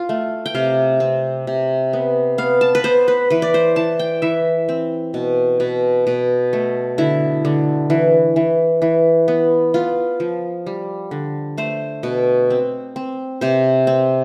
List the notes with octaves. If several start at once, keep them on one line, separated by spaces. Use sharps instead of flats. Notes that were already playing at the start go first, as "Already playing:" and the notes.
Already playing: F4
A3
G5
C3 F5
C4
C3
B3
B3 F5
A5
B4
B3 C5
B4
E3 B4
D5
C5
E3 A5
G5
E3 E5
C4
B2
B2
B2
A3
D3 E4
D3
E3
E3
E3
B3
B3 F4
F3
G3
D3
A3 C5
B2
C4
C4
C3 C5
C4